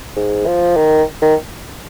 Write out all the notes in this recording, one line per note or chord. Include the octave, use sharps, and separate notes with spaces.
G#2
F3
D#3
D#3